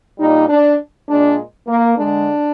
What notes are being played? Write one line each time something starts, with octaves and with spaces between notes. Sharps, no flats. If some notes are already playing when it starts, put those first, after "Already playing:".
A#2 G3 D#4
D4
A#2 G#3 D4
A#3
D3 G#3 D4